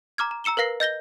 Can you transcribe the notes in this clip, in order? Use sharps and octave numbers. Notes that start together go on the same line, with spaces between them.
A#5 D6 F6 G#6
A#5
A#5 E6 C#7 E7 G7
A#4 B4 F5 A#6 C7
D#5 G6 A#6 G7